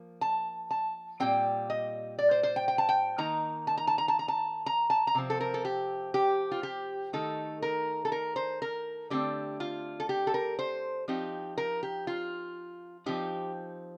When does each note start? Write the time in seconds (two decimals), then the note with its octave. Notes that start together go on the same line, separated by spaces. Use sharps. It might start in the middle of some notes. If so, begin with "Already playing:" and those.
Already playing: F3 A#3
0.21 A5
0.71 A5
1.20 A#2 G3 C4 G5
1.70 D#5
2.19 D5
2.31 C5
2.43 C5
2.56 G5
2.68 G5
2.78 A5
2.89 G5
3.18 D#3 A#3 D#4 A#5
3.67 A5
3.78 A#5
3.87 A5
3.98 A#5
4.08 A5
4.19 A#5
4.28 A5
4.66 A#5
4.90 A5
5.07 A#5
5.15 C3 F3 C4
5.30 A4
5.41 A#4
5.54 A4
5.65 G4
6.14 G4
6.51 F4
6.63 G4
7.13 D#3 A3 D#4 A4
7.63 A#4
8.05 A4
8.12 A#4
8.36 C5
8.62 A#4
9.10 D3 A3 C4 G4
9.60 F4
10.00 A4
10.09 G4
10.27 A4
10.34 A#4
10.59 C5
11.08 F3 C4 D#4 G4
11.58 A#4
11.83 G4
12.07 F4
13.06 F3 C4 D#4 G4